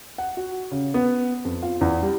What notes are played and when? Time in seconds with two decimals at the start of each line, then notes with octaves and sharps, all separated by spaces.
0.18 F#5
0.37 F#4
0.71 C#3
0.94 B3
1.45 F2
1.63 F4
1.81 E2
2.02 G3